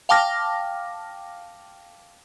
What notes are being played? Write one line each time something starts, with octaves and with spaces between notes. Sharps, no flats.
F5 G5 A5 D6 F6 A#6